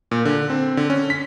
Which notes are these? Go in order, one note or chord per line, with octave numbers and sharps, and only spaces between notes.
A#2
D3
C4
D3
C#4
B6